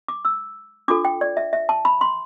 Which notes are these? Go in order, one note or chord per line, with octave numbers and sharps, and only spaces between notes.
D6
E6
D4 F4 A4 D6
G5
D5
E5
E5
A5
B5
C6